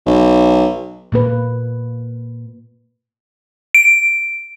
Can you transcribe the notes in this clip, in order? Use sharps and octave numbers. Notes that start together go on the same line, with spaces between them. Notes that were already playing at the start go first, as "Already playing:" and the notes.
B1
A#2 A#3 B4
D7